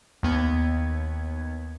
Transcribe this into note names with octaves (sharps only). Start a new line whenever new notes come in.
D#2 B3 G#6